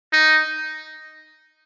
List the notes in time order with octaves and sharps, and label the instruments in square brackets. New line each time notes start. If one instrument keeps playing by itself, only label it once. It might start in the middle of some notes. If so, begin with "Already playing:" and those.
[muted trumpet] D#4